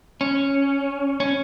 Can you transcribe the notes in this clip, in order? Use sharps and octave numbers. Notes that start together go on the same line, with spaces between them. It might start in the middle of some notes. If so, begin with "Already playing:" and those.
C#4
C#4